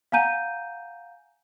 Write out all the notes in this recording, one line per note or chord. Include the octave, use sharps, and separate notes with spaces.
F5 F#5 G#5 A#5 G6 D#7